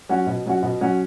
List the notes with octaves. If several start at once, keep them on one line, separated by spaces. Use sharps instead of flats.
F#3 C#4 F#4
B2
F#3 C#4 F#4
B2
F#3 C#4 F#4